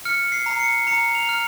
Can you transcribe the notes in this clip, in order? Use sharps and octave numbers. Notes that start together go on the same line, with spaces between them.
F6 C#7
C7
A#5 C7
C#7
A#5 C#7
F7
F6